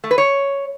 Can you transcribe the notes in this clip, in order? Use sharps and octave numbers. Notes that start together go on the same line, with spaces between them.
A3
B4
C#5